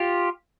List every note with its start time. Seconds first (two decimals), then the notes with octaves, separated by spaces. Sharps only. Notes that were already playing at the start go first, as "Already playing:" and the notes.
Already playing: F4 G4